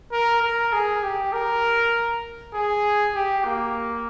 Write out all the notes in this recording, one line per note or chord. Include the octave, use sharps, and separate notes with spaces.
A#4
A#4
G#4
G4
A#4
G#4
G4
A#3